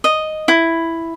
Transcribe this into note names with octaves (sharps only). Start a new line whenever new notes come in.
D#5
E4